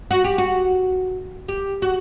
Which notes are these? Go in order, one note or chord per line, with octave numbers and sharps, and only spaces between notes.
F#4
G4
F#4
G4
F#4